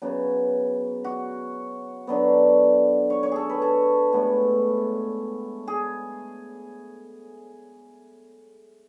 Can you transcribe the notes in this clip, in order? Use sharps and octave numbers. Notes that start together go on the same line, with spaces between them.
C#3 F#3 B3
F#4
D3 F#3 B3
C#5
C#5
G#4 A4
B4
A4
A2 G#3 B3
G#4